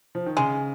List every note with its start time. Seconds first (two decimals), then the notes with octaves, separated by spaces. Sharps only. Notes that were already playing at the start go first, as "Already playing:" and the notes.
0.15 F3
0.26 D#3
0.37 C#3 G#3